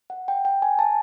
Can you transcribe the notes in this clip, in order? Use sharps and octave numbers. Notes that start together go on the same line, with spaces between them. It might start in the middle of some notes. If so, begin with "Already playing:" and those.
F#5
G5
G5
G#5
A5